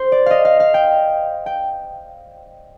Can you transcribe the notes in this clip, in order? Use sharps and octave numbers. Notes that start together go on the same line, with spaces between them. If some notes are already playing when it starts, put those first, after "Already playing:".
Already playing: C5
D5
D#5 F5
F5
F5
G5
G5